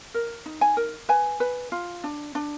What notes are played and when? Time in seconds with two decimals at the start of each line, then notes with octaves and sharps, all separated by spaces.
0.14 A#4
0.46 D#4
0.61 G#5
0.77 A#4
1.09 B4 G#5
1.40 B4
1.72 F4
2.04 D4
2.35 D4